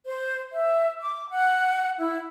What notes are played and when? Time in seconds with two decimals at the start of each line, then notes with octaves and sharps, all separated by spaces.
0.05 C5
0.52 E5
0.99 D6
1.29 F#5
1.98 E4